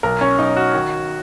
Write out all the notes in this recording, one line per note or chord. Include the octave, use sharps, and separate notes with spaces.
B1 A#4
C#4
B1 D#4
F#4
D#3